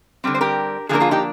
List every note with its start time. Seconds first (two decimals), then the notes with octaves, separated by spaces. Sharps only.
0.24 D3 G3 C4
0.35 C5
0.41 G4 A#4
0.89 D3 F3 F4 G#4
0.93 A#3 D4 A#4
1.00 F4 G#4
1.11 D#4 G4